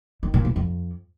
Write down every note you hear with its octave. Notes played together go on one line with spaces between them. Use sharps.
D#3
A#2
E2
F2